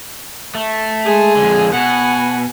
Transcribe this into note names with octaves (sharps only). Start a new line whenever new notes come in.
A3
G#3 G#4
F2 D3
B2 F#5 G#5